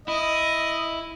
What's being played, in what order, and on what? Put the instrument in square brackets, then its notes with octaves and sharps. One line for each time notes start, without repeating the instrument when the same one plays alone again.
[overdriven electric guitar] E4 [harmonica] D#5